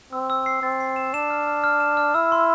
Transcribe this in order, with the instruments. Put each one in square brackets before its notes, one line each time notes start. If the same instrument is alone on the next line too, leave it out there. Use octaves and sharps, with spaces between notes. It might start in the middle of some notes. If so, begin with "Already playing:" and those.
[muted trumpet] C4 [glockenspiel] E6
[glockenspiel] E6
C7
[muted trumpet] C4 [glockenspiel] A6
[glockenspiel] C7
E7
[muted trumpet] D4 [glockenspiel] E7
[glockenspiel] F6
F6
F6
E7
F6
[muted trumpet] E4 [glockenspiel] E6
[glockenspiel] C6